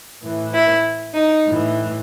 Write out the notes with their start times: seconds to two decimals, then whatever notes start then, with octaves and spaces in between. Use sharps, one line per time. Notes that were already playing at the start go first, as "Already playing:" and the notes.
0.22 A2 E3
0.53 E4
1.13 D#4
1.45 A2 E3